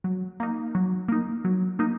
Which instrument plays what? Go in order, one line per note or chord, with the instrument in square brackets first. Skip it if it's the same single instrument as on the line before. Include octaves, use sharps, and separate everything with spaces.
[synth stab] F#3
A#3 D#4
F#3
A#3 D#4
F#3
A#3 D#4